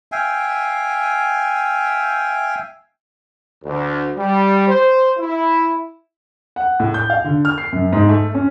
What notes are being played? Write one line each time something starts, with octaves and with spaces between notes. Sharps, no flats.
E5 F5 G5 G#5
D2
G3
C5
E4
F#5
A2
G6
F5
D3
F6
C7
F#2
G#2
A3
C#4